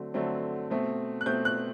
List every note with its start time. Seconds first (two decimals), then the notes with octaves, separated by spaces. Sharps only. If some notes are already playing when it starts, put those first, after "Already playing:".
Already playing: D3 F#3 A3 C4
0.14 D3 F#3 A3 C4
0.70 B2 A3 C4
1.21 F#6
1.26 B2 A3 C4 G6
1.45 F#6